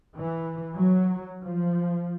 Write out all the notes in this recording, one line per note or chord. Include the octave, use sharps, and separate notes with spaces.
E3
F#3
F3